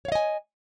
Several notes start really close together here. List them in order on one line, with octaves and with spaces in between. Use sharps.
C#5 F5 D#5 G#5